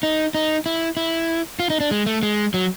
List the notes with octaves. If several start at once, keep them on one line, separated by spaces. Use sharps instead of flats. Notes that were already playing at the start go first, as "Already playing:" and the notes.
D#4
D#4
E4
E4
F4
D#4
D4
G#3
A3
G#3
F#3